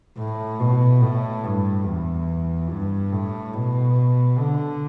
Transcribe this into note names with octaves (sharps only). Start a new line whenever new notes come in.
A2
B2
A2
G2
E2
G2
A2
B2
D3